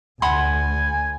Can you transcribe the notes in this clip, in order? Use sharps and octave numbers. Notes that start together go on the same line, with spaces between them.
D2 F#5 G#5 B5 C6